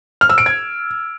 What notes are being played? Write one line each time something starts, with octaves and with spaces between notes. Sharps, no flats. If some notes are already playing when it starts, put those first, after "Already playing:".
F6
E6
D7
G#6